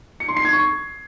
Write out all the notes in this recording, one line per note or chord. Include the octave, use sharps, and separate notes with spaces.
C#7
C6
C7
G#6
C#6